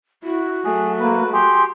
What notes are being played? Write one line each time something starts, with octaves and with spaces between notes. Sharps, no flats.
E4 F#4
F#3 A3 G#4
A#3 B4
G4 G#4 C6